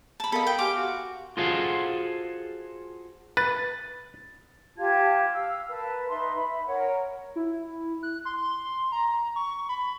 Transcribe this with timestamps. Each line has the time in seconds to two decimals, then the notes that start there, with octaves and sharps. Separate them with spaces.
0.20 A5 B5
0.32 B3 A4 A#4 D#5 F5 B5
0.47 G5
0.58 G4 F5 G#5 C6 D6
0.76 F#4
1.37 F4 F#4 G#4 A4 C5 F5
3.37 B4 A6
4.77 F4 G4 A5 G#6
5.32 F5 E6
5.70 A#4 B4 A5
6.08 D#4 B4 E5 C6
6.35 E5 B5
6.66 A#4 C#5 F#5
7.36 E4
8.03 F#6
8.25 C6
8.92 A#5
9.36 C#6
9.69 B5